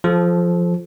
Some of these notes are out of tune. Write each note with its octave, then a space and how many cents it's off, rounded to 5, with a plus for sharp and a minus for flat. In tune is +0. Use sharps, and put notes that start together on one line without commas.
F3 +0 A4 -25